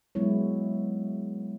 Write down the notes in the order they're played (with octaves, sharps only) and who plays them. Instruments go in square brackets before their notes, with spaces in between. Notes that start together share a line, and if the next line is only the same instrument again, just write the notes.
[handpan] F#3 G#3 B3 E4 C#5